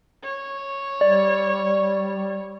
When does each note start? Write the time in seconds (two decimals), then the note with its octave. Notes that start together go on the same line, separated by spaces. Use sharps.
0.23 C#5
1.01 G3 D5